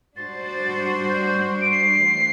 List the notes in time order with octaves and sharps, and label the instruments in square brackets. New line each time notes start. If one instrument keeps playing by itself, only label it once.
[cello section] G3 D4 F#4 C5 [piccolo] A6
[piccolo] G6
D7
C7
[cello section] E3 A3